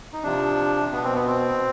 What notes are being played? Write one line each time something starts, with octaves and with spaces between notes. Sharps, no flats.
D#4
C3 F3 D4
B2 B3
C4
B3
C4